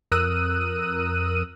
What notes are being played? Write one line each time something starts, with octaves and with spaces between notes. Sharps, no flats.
F2 A#4 D#6 E6 F#6 D#7